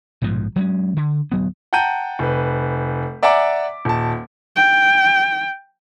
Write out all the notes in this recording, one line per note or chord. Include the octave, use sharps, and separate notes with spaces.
A#1 G#2 B2 F3
F#3 G#3 A#3 C#4
D3
D1 F#3 B3
F#5 G5 A5 A#5 G6 D#7
F1 B4
D5 E5 F#5 G#5 A#5 D6
D#1 A5
G5